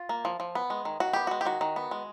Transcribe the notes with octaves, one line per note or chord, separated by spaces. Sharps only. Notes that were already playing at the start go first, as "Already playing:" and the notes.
Already playing: F4
A#3
F3
F3
B3
G#3
D#3
D#3 F#4
B3 G4
G#3 F#4
G4
D#3 F#4
D#3
B3
G#3